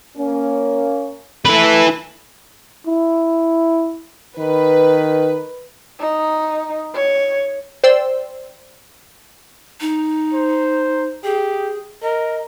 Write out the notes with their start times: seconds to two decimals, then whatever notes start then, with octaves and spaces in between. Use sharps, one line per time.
0.18 A#3 C#4
1.46 E3 A3 E4 B4
2.87 E4
4.39 D#3 B4
5.99 D#4
6.94 C#5
7.84 C5 D5 G5 C6 E6
9.81 D#4
10.34 C5
11.24 G4 G#4
12.02 A#4 D#5